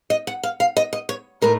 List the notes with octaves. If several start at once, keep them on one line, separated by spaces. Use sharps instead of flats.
D#5
F#5
F5
F5
D#5
D#5
C#5
A2 A3 D#4 A#4